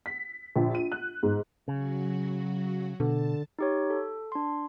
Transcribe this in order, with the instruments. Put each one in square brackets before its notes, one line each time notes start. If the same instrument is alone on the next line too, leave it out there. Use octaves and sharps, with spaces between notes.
[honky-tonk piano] B6
A#1
D#7
F#6
G#2
[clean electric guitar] C#3 [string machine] F#3 F#4
[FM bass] B2 [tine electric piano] D3 [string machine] A5
[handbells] D#4 G4 C#5
A4
D4 C6